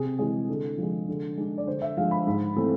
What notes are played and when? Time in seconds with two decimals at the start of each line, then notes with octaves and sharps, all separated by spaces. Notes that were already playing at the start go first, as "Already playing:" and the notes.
Already playing: C3 G#4
0.19 E3 G#3 G#4
0.49 D3 A4
0.78 F3 G#3
1.08 D3
1.38 G#3 D4
1.58 D5
1.67 D3 C5
1.82 E5
1.97 F3 G#3 D4 F5
2.11 B5
2.27 G#2
2.56 E3 A3 C4